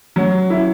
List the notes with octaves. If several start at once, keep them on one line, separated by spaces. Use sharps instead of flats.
F#3
E4